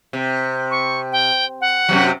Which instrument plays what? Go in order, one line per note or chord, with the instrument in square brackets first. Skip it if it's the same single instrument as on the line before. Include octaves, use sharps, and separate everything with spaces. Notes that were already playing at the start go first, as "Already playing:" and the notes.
[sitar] C3
[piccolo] C#6
G5
F#5
[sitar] F#2 C3 F#3